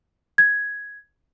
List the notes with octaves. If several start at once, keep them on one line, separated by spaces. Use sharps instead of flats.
G#6